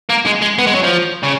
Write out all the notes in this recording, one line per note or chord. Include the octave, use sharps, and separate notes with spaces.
A#3
G#3
G#3
B3
G#3
F#3
F3
C#3